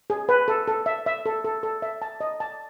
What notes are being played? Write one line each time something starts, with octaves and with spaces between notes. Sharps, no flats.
G#4
B4
A4
A4
E5
E5
A4
A4
A4
E5
A5
D#5
A5